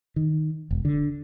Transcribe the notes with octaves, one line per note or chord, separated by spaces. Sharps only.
D#3
E1
D3